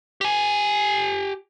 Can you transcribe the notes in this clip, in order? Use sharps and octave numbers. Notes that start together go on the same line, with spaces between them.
G4 G#5